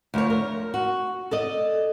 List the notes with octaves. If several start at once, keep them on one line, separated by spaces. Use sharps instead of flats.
D2 F3 C#5
A#4
F#4
A4 D5 D#5